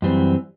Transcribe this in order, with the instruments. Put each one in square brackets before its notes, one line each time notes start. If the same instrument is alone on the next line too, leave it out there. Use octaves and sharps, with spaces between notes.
[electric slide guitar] F#2 E3 G3 C4